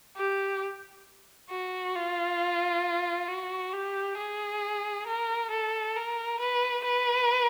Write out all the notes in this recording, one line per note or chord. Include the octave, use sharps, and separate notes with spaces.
G4
F#4
F4
F#4
G4
G#4
A#4
A4
A#4
B4
B4